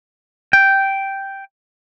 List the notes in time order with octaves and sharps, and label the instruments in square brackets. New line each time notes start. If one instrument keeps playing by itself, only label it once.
[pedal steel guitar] G5